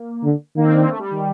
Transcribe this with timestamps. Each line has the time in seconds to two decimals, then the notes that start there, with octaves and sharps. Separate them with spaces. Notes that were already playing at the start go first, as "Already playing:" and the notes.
Already playing: A#3
0.24 D3
0.56 D#3 A#3
0.64 C4
0.73 D4
0.81 A#3
0.89 A3
0.99 G3
1.11 D#3